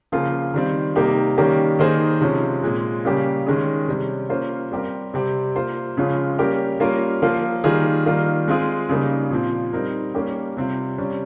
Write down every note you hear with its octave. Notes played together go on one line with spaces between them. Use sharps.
C#3 F3 A#3 F4 G#4
D#3 G3 C4
C3 G3 A#3 D#4 G4
D#3 G3 A#3 C#4 G4
D#3 A#3 D#4 G#4 C5
C3 F3 G#3 C#4
A#2 G#3 C4
C#3 G3 A#3 C#4 G4
D#3 G#3 C#4 G#4
C3 G3 C#4
A#3 C#4 F4 C5
G3 C4 G4 A#4
C3 G3 C4 G4
A#3 F4 C5
C#3 F3 G#3 C#4 F4
G3 A#3 C#4 G4 A#4
G3 A#3 C#4 F4 A#4
F3 A#3 F4
D#3 G3 A#3 F4 G#4
D#3 G3 A#3 F4
G#3 C4 F4 G#4
C#3 G3 A#3 D#4
A#2 F3 C4
G3 C4 D#4 A#4
G3 A#3 C#4 G4
C3 G3 C4 F4
C3 G3 C#4